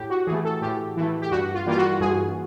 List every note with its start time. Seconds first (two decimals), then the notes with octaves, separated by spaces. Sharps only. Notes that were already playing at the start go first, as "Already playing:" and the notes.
Already playing: A2 G4
0.10 F#4
0.27 E3 A3 G#4
0.45 A4
0.62 A2 G4
0.97 E3 A3
1.22 G4
1.31 G2 F#4
1.54 F4
1.66 E3 G3 A#3 F4
1.78 F#4
2.00 G2 G#4